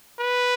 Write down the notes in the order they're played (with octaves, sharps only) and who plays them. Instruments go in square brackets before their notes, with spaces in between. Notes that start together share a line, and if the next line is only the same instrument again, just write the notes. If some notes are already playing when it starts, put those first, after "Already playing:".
[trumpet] B4